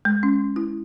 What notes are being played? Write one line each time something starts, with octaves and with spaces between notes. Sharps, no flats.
G#3
C#4
E4